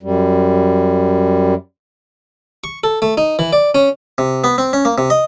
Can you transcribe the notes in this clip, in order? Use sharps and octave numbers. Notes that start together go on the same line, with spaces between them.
F#2 G3
C#6
A4
A3
D#4
E3
D5
C#4
C3
B3
C4
C#4
A#3
C3
D#5